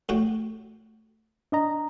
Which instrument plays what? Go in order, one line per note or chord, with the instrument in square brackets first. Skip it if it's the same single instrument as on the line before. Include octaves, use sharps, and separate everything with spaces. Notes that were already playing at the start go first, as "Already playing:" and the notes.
[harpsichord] A2 F#4 G5
[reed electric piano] D4 D#5 A#5